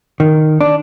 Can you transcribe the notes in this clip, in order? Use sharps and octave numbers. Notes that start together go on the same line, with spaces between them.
D#3
D4